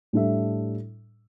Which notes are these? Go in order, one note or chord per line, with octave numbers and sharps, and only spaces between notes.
A2 G3 D4 A4 E5